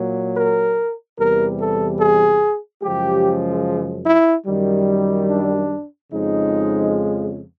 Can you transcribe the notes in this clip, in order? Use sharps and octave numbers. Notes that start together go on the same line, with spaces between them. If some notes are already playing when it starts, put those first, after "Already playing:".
Already playing: A#2 F#3
A#4
E2 C3 E3 G3 A#4
A4
G#4
F#2 C#3 F3 G#3 G4
E4
F#2 D#3 G3
D4
F2 C#3 F3 G#3 D#4